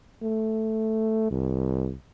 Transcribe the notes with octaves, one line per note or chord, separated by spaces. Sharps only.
A3
C2